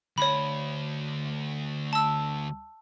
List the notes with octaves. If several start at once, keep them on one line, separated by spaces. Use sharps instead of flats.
D2 C#5 B5
A5 E6